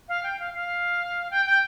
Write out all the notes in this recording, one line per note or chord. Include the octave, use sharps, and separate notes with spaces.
F5
G5
F5
F5
G5
G5